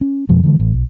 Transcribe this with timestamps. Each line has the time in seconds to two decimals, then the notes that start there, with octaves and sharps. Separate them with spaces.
0.01 C#4
0.29 F2 B2 F3 G#3
0.43 D3 E3 G3 G#3
0.60 A1
0.73 B1